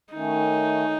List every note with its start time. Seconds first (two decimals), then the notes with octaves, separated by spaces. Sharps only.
0.13 D#3 A3 C#4 D#4